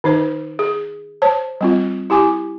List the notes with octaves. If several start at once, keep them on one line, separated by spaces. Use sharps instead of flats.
D#3 D#4 C5
G#4
C5 C#5 A5
G3 C4 F4
E4 G4 G#5 D6